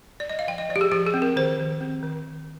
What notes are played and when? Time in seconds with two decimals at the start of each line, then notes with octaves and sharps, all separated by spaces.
0.20 D5
0.29 D#5
0.39 F5
0.48 F3 G5
0.58 D#5
0.69 F3 D5
0.76 G4
0.81 G#4
0.91 F3 G4
1.07 G#4
1.14 C4
1.22 A#4
1.36 D#3 C5
1.58 D#3
1.81 C4
2.03 D#3
2.25 D#3